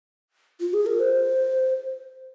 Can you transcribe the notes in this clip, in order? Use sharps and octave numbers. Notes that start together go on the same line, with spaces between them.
F4
G#4
A#4
C5